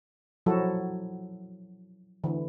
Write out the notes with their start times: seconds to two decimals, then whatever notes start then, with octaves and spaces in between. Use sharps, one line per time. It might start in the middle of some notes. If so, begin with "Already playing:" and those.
0.46 F3 F#3 E4 F#4 A4
2.24 D3 E3